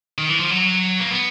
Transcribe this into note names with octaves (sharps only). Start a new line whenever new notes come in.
D#3
E3
F3
F#3
A#3
B3